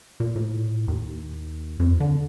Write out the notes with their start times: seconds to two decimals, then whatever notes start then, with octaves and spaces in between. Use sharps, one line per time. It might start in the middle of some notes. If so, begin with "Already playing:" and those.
0.20 A#2
0.36 A2
0.88 D#2
1.80 F2
2.00 D3